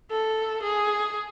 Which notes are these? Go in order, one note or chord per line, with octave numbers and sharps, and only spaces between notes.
A4
G#4